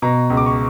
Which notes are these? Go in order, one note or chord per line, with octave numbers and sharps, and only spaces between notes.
B2 A#5
C#2
D6
C#6